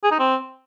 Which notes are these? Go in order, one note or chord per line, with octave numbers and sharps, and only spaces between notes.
G#4
D#4
C4